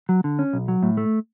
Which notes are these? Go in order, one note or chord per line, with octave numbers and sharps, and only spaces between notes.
F#3
D3
C#4
B1
F#3
A2
A3